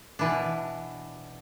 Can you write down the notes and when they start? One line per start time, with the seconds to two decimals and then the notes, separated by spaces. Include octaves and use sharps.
0.19 B2 E3 D4